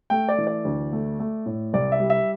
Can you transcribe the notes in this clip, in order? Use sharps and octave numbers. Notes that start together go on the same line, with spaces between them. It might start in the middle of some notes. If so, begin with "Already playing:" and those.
A3 G5
D5
E3
D5
D2
A3
A3
A2
C2 D5
E5
G3
E5